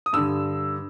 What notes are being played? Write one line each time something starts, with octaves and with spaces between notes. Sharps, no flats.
D#6
G2 D3 E6